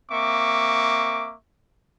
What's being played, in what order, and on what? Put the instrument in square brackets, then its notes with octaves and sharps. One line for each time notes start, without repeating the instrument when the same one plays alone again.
[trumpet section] A#3 C4 E5 C#6 D6